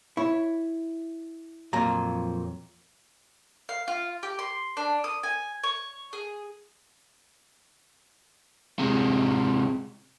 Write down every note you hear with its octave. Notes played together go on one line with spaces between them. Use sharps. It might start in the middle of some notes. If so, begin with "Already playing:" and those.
E4 C#5
F2 A#2 F3 F#3 A#5
F5
F4
G4
C6
D4
D#6
G#5
C#5
G#4
C3 G#3